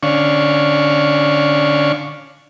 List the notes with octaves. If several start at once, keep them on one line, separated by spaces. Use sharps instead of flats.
D3 C#4 D4 F5 C#6